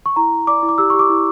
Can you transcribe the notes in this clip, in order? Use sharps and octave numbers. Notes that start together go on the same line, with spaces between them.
C#6
E4 A#5
E4
D5 D6
E4
D6
G4 E6
C#6
G4 D6
E4